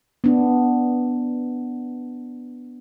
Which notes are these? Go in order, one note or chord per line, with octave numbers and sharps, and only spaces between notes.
B3 D4